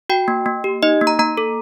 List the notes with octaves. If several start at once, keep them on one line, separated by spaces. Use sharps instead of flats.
F#4 G5
A#3
A#3
G4
D#4 D#5
A#3
A#5
A#3 A#5
A4